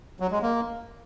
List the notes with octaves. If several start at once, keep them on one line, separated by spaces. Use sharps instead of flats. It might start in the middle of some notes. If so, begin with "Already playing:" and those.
F#3
G#3
A#3